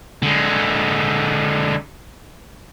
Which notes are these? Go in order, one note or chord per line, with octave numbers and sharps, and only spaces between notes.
D3 G#3